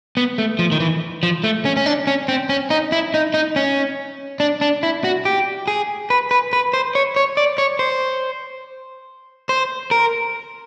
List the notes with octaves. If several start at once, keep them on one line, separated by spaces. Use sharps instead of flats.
B3
A3
F3
D#3
E3
F3
A3
C#4
C#4
D4
C#4
C4
C#4
D#4
E4
D#4
D#4
C#4
D4
D4
E4
F#4
G4
G#4
B4
B4
B4
C5
C#5
C#5
D5
C#5
C5
C5
A#4